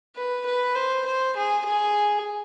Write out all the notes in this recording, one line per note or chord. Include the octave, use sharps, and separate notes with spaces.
B4
B4
C5
C5
G#4
G#4